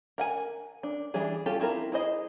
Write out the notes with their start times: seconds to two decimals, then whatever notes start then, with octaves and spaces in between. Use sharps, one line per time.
0.18 A#4 F#5 G#5
0.83 D4
1.14 E3 G3 D4 G#4
1.46 C#4 F4 G4 A4
1.60 C4 E4 F4 A#4
1.92 E4 G#4 C5 D#5